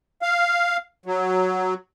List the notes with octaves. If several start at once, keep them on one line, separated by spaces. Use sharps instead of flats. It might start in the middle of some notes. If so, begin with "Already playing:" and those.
F5
F#3